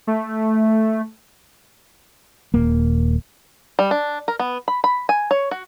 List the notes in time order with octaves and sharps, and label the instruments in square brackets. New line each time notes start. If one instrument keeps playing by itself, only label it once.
[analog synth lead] A3
[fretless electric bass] D#1 A#3
[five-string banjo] G3
D4
A#4
B3
B5
B5
G#5
C#5
F#4